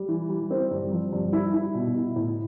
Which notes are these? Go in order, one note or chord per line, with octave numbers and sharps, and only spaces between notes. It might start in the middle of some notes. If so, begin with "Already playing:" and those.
Already playing: G3
E3
G3
C4
G2
F3
G2
E4
E4
B2
E4
A2